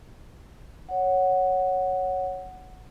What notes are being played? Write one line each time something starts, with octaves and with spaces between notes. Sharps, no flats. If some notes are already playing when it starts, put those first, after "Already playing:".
C#5 F#5